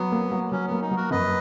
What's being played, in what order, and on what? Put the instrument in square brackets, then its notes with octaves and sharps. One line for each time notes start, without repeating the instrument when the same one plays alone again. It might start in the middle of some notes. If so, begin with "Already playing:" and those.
Already playing: [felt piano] F#3 [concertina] B3
[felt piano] A#3
F#3
[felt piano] F#3 [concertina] C#4
[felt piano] A#3 [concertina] B3
[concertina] D#4
[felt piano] F#3
[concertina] F#4 A#4
[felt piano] F#2 [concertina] B4 D#5